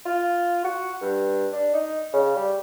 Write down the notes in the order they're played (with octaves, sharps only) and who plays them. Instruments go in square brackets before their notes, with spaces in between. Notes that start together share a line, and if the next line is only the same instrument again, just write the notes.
[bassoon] F4
F#4
G2
D4
D#4
C#3
G3